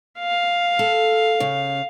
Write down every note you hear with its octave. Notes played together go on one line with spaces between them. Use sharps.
F5
A4
C#3